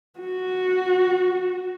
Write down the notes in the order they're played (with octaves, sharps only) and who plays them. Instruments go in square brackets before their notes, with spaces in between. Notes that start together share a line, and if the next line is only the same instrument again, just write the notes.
[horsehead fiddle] F#4